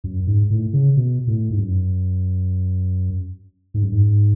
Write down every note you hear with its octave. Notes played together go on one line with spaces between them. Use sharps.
F#2
G#2
A2
C#3
B2
A2
G#2
F#2
G#2
F#2
G#2